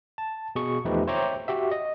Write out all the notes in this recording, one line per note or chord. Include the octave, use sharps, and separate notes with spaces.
A5
B2 G#4 C#6
E2 F3 A3 D#4 G4 B4
C5 C#5 E5 G5 A#5 D6
F#4 G4 E5
D#5